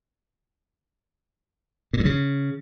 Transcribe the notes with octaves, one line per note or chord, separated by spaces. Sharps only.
A#2
G2
C#3